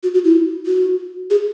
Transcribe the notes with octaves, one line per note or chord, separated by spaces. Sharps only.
F#4
F#4
E4
F#4
G#4